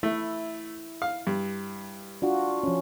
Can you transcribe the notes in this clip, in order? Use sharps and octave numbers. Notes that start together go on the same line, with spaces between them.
A3 E4
F5
G2
D4 F4 F#4
F3 C#4